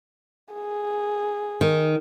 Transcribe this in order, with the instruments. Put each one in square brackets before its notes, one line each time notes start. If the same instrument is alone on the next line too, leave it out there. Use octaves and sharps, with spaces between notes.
[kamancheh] G#4
[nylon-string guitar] D#3